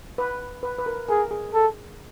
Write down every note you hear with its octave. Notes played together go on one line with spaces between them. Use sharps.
B4
B4
B4
A#4
G#4 A#4
G#4
A4